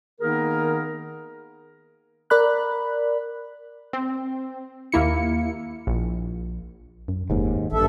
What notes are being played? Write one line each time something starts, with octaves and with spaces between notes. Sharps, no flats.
D#3 A#3 B3 D#4 G#4 A#4
A#4 D5 B5 F#6
C4
D#2 A#3 E4 C#7
A#1
F#2
F1 D#2 G#2
A1 G2 A4 E5